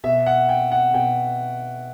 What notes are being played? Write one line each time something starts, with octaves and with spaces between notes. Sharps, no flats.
B2 E5
F#5
G5
F#5
B2 G5